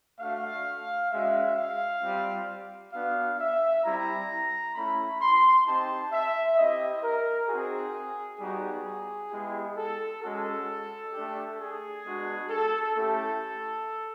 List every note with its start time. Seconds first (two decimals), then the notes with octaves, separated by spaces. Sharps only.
0.20 A3 D4 F#4 F5
1.11 G#3 C#4 F#4 E5
1.57 F5
2.02 G3 C4 F4
2.93 B3 D4 F#4 F5
3.39 E5
3.84 G3 C4 E4 A#5
4.75 A3 C#4 E4 B5
5.21 C6
5.66 C4 D#4 G4 A5
6.12 E5
6.57 C4 E4 G4 D#5
7.03 A#4
7.48 C4 D#4 F#4 G#4
8.40 G3 B3 D#4 F#4 G#4
9.31 G#3 B3 E4 G4
9.77 A4
10.22 G#3 C#4 F#4 A4
11.13 A3 D4 G4
11.59 G#4
12.04 G#3 B3 D4 F#4
12.50 A4
12.95 A3 C#4 E4 G4 A4